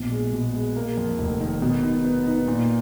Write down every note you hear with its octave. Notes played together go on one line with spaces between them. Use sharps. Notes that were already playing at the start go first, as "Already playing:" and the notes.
Already playing: A#1 B2
G#3
B2
G#3
A#3
F2
F1
D#3
B2
D#4
B3
D#4
A#2